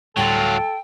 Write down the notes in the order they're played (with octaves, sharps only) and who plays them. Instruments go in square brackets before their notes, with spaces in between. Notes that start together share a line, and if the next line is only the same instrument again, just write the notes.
[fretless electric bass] D2 A2 G3 [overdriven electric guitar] F#3 F4 [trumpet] A4 [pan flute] G5